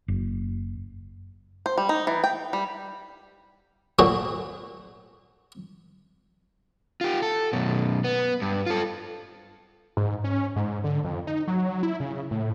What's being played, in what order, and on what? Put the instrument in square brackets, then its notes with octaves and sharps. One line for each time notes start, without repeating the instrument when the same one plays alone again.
[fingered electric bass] F#1
[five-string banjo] C5
G3
D#4
E3
G5
G3
[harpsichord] A#2 F#3 A3 D#4 F#4
[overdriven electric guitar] F4 G4
A4
F#2 B2
B3
G2
F4 A4
[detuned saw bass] G#2
C#4
G#2
D3
F2
D#4
F#3
E4
C#3
A2